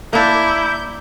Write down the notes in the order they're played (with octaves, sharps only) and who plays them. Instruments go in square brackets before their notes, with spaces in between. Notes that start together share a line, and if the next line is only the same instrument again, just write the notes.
[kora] A#3 D4 [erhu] E4 [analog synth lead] G6